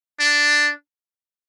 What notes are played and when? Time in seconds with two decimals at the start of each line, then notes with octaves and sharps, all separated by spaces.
0.20 D4